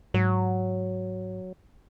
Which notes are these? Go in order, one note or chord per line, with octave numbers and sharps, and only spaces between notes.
G#2 F#3